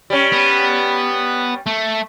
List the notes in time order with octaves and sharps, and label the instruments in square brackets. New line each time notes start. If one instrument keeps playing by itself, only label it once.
[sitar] G3 C#4
[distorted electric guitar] B3
A3